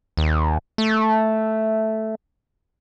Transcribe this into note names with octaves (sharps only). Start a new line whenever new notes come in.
D#2
A3